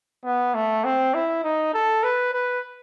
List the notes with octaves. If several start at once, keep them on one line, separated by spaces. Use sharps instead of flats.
B3
A3
C4
E4
D#4
A4
B4
B4